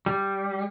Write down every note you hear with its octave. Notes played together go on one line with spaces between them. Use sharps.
G3